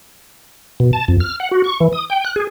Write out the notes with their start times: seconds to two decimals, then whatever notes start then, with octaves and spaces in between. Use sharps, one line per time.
0.80 B2
0.93 A5
1.08 F2
1.20 F6
1.40 F#5
1.51 F#4
1.64 C#6
1.80 E3
1.93 D#6
2.10 G5
2.25 F#6
2.36 G#4